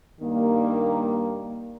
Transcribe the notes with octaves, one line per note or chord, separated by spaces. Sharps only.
G2 D#3 G3 A#3